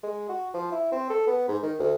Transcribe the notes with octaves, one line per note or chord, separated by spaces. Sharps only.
G#3
F#4
F3
E4
C4
A4
B3
G#2
D#3
D2